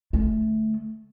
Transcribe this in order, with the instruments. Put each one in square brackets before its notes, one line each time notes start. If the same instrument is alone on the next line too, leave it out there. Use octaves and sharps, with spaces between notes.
[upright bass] D3 A3